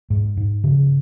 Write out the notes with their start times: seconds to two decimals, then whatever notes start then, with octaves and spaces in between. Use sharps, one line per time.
0.10 G#2
0.37 G#2
0.64 C#3